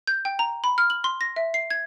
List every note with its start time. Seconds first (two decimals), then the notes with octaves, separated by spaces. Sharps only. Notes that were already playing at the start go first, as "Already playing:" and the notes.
0.07 G6
0.25 G5
0.39 A#5
0.64 B5
0.78 F6
0.90 F#7
1.04 C6
1.21 A#6
1.36 E5
1.54 C7
1.70 G#6